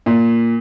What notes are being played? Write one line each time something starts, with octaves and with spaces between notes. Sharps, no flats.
A#2